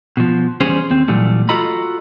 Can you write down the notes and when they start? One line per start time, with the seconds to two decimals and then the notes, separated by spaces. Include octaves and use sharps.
0.17 B2 F3
0.61 E2 G3 C#4 G#4 C5
0.90 D#2 C4
1.08 A#2 E3 F#3 G3 A3
1.49 F4 F#4 A4 D#5 A#5 B5